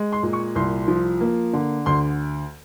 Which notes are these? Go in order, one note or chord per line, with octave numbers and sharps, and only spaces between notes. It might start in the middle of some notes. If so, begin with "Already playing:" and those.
Already playing: G#3
C6
A#2
C#6
C2 C6
F3
A#3
D3
D2 C6